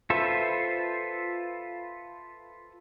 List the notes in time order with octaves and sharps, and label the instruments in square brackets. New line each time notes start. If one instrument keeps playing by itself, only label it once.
[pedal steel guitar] F4 A4 B4 C5 E5